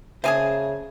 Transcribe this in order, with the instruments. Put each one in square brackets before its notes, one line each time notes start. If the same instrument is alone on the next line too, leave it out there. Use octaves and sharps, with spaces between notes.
[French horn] C#3 [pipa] G#3 A#3 G#4 [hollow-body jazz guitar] C5 G#5 A5 [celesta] E5